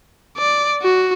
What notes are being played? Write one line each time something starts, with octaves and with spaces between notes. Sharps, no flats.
D5
F#4